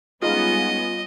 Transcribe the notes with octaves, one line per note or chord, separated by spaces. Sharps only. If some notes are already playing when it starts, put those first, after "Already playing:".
G3 G#3 B3 C#4 D#4 F4 G#4 D#5